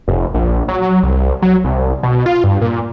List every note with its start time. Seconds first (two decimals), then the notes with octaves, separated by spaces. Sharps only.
0.08 F1
0.34 A#1
0.68 F#3
1.03 C2
1.42 F#3
1.64 C2
2.03 B2
2.26 F4
2.44 G2
2.61 A#2